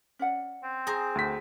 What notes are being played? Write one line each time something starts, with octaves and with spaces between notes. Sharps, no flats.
C#4 D5 F#5
C4
G#4 C5 A#5
D2 B6